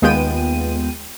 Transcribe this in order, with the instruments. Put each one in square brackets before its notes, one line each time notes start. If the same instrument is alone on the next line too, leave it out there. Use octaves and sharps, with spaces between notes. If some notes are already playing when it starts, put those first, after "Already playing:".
[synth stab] D#2 G#3 B3 F4 G5 D#7